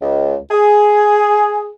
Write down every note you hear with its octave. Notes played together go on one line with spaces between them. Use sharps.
C#2
G#4